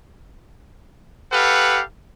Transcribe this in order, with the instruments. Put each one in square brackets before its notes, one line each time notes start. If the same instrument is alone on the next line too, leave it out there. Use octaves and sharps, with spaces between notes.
[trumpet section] G4 A4 B4 F5 F#5